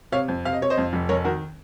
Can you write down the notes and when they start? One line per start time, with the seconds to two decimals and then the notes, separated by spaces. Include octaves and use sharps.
0.12 C3 C#5 F5
0.28 F2
0.45 C3 F5
0.53 D#5
0.61 C3 C#5
0.70 C5 D#5
0.77 F2
0.93 F1
1.09 F1 A#4 C#5
1.25 D#3 F#4 A#4